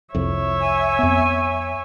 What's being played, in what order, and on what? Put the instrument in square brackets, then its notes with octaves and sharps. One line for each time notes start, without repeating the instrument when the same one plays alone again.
[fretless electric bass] C2 F2 [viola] C#5 E5
[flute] G#5
[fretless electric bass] F2 B3